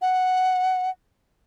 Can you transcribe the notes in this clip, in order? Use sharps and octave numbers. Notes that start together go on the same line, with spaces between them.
F#5